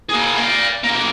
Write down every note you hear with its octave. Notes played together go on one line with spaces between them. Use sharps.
A#3 G#4
D5 F5
B1 A#3